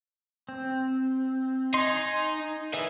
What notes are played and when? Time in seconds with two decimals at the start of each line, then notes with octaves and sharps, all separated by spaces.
0.49 C4
1.74 D#4 G#5 C6
2.74 G#4 B4 E5